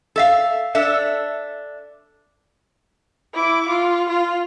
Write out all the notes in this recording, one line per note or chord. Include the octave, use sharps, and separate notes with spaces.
A4 E5 F5
D4 A4 E5
E4 D6
F4
F4